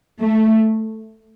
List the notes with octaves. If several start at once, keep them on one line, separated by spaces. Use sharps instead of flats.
A3